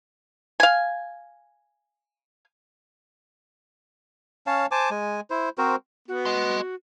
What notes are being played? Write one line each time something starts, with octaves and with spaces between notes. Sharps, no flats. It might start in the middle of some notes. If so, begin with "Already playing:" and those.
F5 G#5
C#4 C#5 F5 A5
C5 G#5 A5 D6
G#3 G#5
E4 C5
C4 F#4 A#4 C5
B3 F#4
D#5 C6